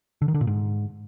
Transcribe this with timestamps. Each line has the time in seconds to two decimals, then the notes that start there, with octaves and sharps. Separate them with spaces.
0.22 D3
0.28 D#3
0.34 D3
0.41 A#2
0.47 G#2